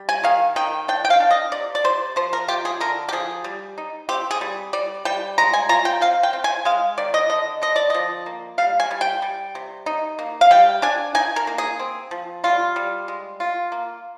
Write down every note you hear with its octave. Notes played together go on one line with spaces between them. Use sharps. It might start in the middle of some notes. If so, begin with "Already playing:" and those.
Already playing: G3
G#5
D#3 F5
D#3 G5
D4 G5
G5
F5
D4
D#5
C3 D5
D5
C3 C5
F3 C5
A#4
F4 G4
G#4
D3 A#4
G4
F3 G#4
G3
D#4
C4 G4
G#4
G3
G3 D5
G3 G5
G#3 A#5
G#5
F4 A#5
G5
C4 F5
G5
C4
G#5
G#3 F5
D#3 D5
D#5
D3 D#5
D3 D#5
D5
F3 D#5
A#3
G3 F5
G#5
G3
G5
G3
C3
D#4
A#3
F5
G3 G5
D4 G#5
D#4 G#5
A#4
A#3
G#4
C4
F3
G3 F4
G3
G#3
F4
A#3